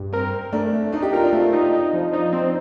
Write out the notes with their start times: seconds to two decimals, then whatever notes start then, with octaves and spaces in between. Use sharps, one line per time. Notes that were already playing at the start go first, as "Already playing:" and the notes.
Already playing: G2
0.13 C4 A#4
0.34 A#4
0.53 A3 D4
0.73 A3
0.92 D4 D#4
1.02 G4
1.13 F4 A#4
1.24 D4
1.33 A3 C4
1.53 D#4
1.73 D#4
1.93 F3
2.12 D4 D#4
2.33 C4